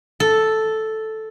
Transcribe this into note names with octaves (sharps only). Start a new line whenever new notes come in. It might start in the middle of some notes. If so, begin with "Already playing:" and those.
A4